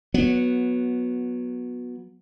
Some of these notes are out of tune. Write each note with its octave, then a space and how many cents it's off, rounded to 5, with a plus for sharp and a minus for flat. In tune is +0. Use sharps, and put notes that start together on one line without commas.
F#3 -15 B3 -10